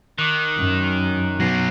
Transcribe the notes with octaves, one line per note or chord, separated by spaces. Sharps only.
D#3 D6 F#6
F#2
B2 F#3 A#6 C7